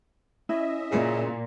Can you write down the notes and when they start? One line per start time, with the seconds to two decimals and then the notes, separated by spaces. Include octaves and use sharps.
0.49 C#4 E4 D#5 E5
0.91 A#2 C#3